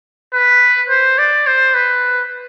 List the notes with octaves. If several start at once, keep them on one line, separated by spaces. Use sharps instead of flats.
B4
C5
D5
C5
B4